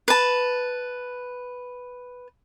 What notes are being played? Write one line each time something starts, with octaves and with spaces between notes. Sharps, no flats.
B4 A5